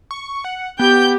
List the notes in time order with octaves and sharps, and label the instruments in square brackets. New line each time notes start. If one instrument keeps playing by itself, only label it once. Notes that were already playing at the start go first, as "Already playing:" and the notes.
[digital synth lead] C#6
F#5
[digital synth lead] B3 [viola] G4 [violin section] G5 G6